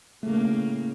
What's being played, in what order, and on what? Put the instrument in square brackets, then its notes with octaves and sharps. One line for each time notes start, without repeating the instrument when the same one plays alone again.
[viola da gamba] A2 C#3 A#3 [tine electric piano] A3